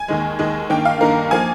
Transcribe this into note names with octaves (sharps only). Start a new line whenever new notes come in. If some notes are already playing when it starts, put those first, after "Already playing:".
Already playing: G#5
D#2 D#3 G#3
D#2 D#3 G#3
G2 D#3 A#3 G5
F5
G2 D#3 A#3 A#4
F3 A#3 G#5